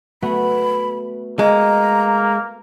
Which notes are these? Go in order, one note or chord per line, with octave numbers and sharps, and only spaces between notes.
A3 B3 F#4 B5
G#3 A#3 A#5